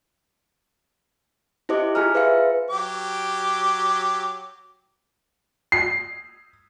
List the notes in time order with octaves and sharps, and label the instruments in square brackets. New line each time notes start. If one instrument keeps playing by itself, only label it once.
[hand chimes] E4 G4 C5 D#5 D6
F4 G#4 G#5 A#5 F6
B4 C5 E5 F5 C#7
[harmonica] F#3 G4 D6
[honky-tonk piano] C7